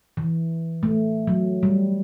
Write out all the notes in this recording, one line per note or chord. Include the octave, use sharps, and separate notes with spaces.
E3
A3
F#3
G3